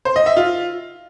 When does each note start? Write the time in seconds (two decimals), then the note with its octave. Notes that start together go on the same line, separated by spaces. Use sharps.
0.05 C5
0.16 D#5
0.26 E5
0.37 F4